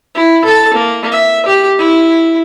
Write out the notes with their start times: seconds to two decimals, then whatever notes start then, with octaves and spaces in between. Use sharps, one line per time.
0.15 E4
0.44 A4 A5
0.74 A#3
1.12 E5
1.46 G4
1.79 E4